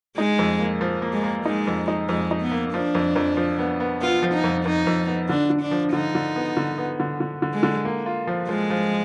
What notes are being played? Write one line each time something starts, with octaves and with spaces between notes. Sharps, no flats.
G#3 D#4
F2
A#3
F3
A#3
G#3
A#3
G#3 D#4
F2
D#4
F2 G#3
D#4
B3
A#3
F3 D4
F2
F2
F3
B3
B3
B3 F4
F3
D#4
F2
F2 D#4
F2
B3
D3 D4
D3
D4
F3
D3 D#4
D3
B3
D3
B3
D3
D3
D3
G#3
D3
A#3
F4
F3
F3 G#3
F3